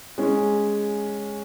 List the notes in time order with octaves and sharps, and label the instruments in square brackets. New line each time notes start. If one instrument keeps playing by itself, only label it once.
[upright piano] G#3 C#4